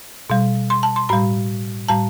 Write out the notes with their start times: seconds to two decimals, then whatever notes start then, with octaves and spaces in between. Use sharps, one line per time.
0.30 B2 G3
0.70 C6
0.83 A5
0.96 C6
1.09 A2 G3 B5
1.89 A2 G3 A5